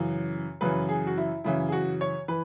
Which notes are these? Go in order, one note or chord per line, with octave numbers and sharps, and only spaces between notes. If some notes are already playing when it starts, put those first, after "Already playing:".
Already playing: F#2 C#3 E3
F#2 C#3 E3 B4
G#4
F#4
E4
F#2 C#3 E3 E4
G#4
F#4
C#5
E3 B4